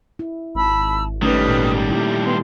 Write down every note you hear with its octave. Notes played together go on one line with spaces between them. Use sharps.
E4
G#1 A5 B5 E6
D#3 G3 A3 C#4 D#4 B4 D#6 F6
A#2
A#3 E4 G4
B3 C6